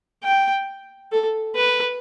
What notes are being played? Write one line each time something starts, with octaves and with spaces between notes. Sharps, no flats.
G5
A4
B4